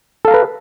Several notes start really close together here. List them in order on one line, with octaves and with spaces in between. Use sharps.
A4 F5 A#5 B4